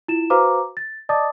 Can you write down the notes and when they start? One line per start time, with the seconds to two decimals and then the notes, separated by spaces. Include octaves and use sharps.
0.08 E4 F4 E7
0.30 F#4 B4 C5 F5 A#5 D6
0.77 A6
1.09 D5 D#5 A5 D6 D#6 A6